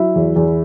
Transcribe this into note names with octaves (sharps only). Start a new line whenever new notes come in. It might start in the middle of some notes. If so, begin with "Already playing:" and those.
Already playing: F#3 E4
E2
E2